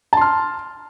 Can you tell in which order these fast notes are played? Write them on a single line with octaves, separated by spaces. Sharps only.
A5 C6 F6